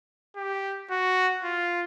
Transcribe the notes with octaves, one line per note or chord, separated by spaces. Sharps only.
G4
F#4
F4